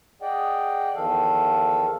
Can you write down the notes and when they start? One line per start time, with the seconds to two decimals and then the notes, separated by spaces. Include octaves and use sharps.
0.22 G#4 D5 D#5 F#5 G5
0.95 E2 D#3 F3 A4 F5